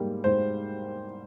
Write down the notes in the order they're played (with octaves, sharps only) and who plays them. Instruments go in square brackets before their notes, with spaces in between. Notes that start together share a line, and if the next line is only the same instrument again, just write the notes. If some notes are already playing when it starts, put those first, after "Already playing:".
Already playing: [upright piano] G#2 G3 A#3
G#2 C5